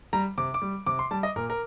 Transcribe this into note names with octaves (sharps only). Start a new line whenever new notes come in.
G3 A#5
C3 D6
D6
G3
C3 D6
C6
G3 A5
D#5
A#2 A#4
A#4